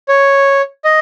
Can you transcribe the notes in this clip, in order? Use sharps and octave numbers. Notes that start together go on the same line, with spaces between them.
C#5
D#5